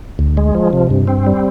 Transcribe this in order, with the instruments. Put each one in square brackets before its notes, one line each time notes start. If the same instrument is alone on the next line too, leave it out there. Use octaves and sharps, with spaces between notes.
[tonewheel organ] D2
G#3
F3
C3
G2
C4
G3